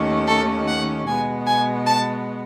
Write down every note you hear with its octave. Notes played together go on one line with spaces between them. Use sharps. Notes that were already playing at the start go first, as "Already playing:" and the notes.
Already playing: D#2 D#3 A3 C#4
A4
F#5
B2 G#3 B3 G#5
G#5
A5